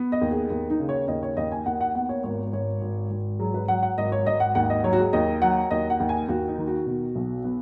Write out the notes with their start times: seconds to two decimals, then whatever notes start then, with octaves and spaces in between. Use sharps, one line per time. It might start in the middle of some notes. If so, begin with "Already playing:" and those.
Already playing: B3
0.12 D#5
0.21 D#2
0.31 G#4
0.50 D#2
0.70 D#4
0.79 C#3
0.89 C#5
1.08 D#2 D#5
1.23 C#5
1.37 D#2 D#5
1.52 G#5
1.66 D#2 F#5
1.81 F#5
1.95 B3 F#5
2.09 C#5
2.24 G#1 C#5
2.53 G#1 C#5
2.81 G#1
3.10 G#1
3.39 F#3 G#4
3.54 B4
3.68 F#3 F#5
3.83 F#5
3.98 G#1 D#5
4.12 C#5
4.26 G#1 D#5
4.40 F#5
4.55 D#2 F#5
4.70 D#5
4.84 F#3 C#5
4.93 F#4
4.98 G#4
5.13 D#2 D#5
5.42 F#3 F#5
5.71 D#2 D#5
5.90 F#5
6.00 D#2
6.09 G#5
6.29 D#2 F#4
6.48 D#4
6.58 D#3
6.67 F#4
6.86 B2
7.15 B1
7.44 B3